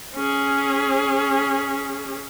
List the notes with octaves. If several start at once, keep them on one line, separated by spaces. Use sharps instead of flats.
C#4 G#4